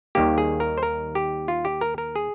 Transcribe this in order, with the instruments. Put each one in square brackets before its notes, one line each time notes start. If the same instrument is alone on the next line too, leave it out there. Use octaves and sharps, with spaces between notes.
[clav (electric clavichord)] D#2 D#3 G3 A#3 G4
G#4
A#4
C5
A#4
G4
F4
G4
A#4
A#4
G#4